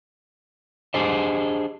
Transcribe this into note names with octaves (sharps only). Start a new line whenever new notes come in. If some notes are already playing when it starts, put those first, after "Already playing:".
D4 G4 G#4 C5 D#5